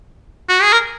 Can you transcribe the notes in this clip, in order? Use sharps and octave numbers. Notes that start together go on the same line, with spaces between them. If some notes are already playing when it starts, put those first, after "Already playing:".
F#4
G#4
A#4